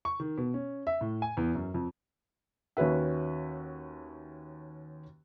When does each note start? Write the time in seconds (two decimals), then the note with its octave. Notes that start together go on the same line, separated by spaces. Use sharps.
0.05 C#6
0.20 D#3
0.38 B2
0.54 C#4
0.87 E5
1.01 A2
1.22 G#5
1.37 E2
1.55 F#2
1.74 F2
2.77 D#2 C#4 F#4 B4 E5